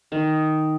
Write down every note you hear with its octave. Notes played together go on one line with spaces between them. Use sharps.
D#3 D#4